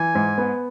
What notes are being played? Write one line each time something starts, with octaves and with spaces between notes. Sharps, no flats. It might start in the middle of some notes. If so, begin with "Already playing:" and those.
Already playing: E3 G#5
G#2
B3